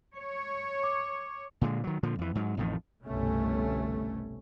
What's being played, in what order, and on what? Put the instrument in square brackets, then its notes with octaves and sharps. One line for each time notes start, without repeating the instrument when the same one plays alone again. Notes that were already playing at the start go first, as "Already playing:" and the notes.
[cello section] C#5
[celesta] D6
[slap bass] A#2 D3 G#3
D#3 F#3
A#2 D3 F3
F2 E3
G#2 F#3
A1 F2 A2 D#3
[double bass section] G1 C2 B2 A3 C#4